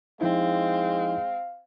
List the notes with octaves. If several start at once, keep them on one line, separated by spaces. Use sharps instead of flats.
F3 G#3 C4 D#4 E4 F5